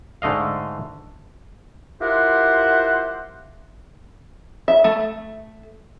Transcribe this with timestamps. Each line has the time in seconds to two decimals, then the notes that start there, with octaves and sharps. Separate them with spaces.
0.22 G#2 D3 A3 D#5 F5
2.01 E4 F4 G4 A#4 C5 F#5
4.68 E5
4.84 A3